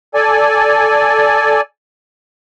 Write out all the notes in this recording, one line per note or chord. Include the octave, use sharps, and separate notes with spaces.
A4 D5 G#5